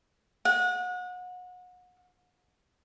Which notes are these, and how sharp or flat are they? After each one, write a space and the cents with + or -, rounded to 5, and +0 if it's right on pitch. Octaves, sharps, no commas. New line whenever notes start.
F#5 -30